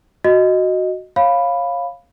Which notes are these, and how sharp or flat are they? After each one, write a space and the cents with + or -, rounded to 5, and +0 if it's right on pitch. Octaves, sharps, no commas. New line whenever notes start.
F#4 +0 D#5 +0
C#5 -20 F5 +0 B5 +0